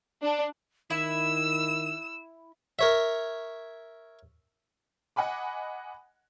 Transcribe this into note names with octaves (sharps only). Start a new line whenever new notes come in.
D4
D#3 E4 E6 E7
A#4 C#5 E5
D#5 F#5 G#5 B5 D6